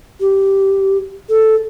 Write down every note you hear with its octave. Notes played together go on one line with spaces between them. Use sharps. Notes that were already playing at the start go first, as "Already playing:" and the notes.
G4
A4